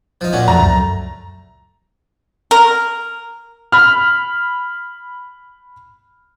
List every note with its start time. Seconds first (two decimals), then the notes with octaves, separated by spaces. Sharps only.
0.21 F3 D#4
0.33 A#2 F#3 C#4
0.48 F2 A3 A#5
0.59 C#2 F#2
2.51 A#4
3.72 B5 F6